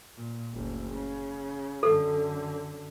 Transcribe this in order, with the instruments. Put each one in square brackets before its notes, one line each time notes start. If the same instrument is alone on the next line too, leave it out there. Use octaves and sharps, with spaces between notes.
[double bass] A#2
F#1 D2
C#3
[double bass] F#2 D3 [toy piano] A4